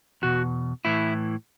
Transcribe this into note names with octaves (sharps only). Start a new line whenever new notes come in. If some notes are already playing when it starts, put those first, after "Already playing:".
E2 B2 F#4
A2 E3 E4